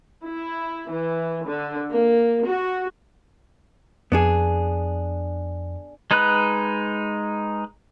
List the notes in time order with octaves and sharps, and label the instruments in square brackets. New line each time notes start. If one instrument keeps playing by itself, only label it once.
[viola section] E4
E3
D3
A#3
F#4
[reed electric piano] F2 [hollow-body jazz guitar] B3 D4 G#4
[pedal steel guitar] G#3 D#4 B4 B5 F#6